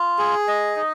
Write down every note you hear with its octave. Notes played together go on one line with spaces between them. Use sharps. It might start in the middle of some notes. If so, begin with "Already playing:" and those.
Already playing: F4
G#4
D#5
D#4